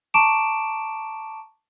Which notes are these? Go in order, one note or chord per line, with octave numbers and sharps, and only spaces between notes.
A5 A#5 C#6 D6 D7 E7